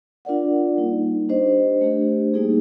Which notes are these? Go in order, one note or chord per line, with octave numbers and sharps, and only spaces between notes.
D4 F4 A#4 D5 F#5
G3 A#3 D#4
D4 G4 C5 D#5
A3 D4 G4 C5
G3 A#3 D#4 G#4